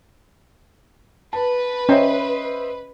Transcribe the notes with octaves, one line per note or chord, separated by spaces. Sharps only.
B4 A5
C#4 C5 D#5 E5 G5 A#5